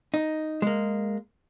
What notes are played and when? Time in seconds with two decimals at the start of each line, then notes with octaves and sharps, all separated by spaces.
0.14 D#4
0.62 G#3 A#3